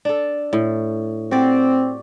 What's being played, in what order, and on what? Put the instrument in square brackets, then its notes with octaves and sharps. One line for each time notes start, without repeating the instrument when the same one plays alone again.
[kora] D4 A4
A2
[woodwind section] C4 [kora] F#4 G4 D5